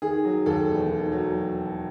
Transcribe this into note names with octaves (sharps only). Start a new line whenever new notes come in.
D#3 G#4
F#3
D#2 A4
E1
D#3
F#3